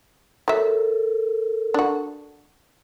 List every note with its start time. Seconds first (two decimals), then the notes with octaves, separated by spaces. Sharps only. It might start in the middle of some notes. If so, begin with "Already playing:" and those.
0.48 F#3 A4 A#4 E5
1.74 D4 F#4